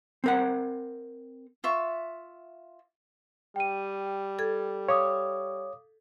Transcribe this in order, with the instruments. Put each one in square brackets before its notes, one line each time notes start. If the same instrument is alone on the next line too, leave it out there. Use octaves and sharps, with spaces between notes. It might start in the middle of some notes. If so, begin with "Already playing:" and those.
[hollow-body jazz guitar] C4 A#4 F#5
[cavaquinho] F4 E5 C#6
[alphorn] G3 [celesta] G5 D#7
[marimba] A4 G#6
[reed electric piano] C#5 [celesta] F5 D6 D#6